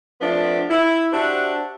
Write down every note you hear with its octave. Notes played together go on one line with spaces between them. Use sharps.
F3 A3 B3 C4 D4
E4
D4 F#4 G4 C5 E5